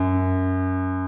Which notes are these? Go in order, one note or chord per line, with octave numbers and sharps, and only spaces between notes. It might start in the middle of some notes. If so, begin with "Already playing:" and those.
Already playing: F#2